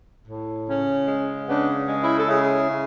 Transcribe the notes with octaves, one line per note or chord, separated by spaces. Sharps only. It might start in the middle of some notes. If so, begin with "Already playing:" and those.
A2
C#3 C#4
G#3
C#3 B3 D4
G#3
C#4 E4
A4
C#3 E4 G#4
C#3